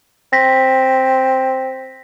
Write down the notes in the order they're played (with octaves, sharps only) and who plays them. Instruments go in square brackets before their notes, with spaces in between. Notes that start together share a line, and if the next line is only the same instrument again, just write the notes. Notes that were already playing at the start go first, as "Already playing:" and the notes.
[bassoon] C4 [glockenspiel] A#6 B6